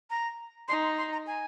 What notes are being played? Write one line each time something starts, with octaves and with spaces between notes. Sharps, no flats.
A#5
D#4 C6
C6
C6
A#5
G#5